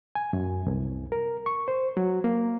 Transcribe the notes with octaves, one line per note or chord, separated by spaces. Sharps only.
G#5
F#2
C2
A#4
C#6
C5
F#3
A#3